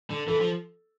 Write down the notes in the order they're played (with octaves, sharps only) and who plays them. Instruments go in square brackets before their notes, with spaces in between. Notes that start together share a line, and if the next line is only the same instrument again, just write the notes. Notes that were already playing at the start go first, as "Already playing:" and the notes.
[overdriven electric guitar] D3
[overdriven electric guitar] E3 [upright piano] A4
[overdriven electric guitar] F3